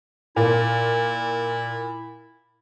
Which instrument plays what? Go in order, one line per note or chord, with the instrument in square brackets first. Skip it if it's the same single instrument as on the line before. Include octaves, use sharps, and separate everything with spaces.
[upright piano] A#2 [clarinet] E4